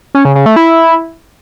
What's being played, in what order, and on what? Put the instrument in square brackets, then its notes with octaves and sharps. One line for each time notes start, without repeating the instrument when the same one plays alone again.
[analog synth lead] C#4
C#3
C#3
A3
E4